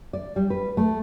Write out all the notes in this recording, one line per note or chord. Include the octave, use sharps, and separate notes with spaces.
D5
G3
B4
A3